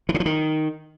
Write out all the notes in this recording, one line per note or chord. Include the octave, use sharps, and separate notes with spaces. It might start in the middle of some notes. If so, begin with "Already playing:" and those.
E3
C#3
F3
D#3